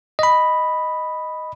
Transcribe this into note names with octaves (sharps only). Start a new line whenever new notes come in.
D#5 B5